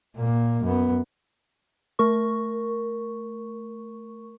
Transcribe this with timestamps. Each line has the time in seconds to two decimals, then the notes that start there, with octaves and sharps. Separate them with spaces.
0.16 A#2 A#3
0.63 F#2 B3
1.99 A3 A#4 C#6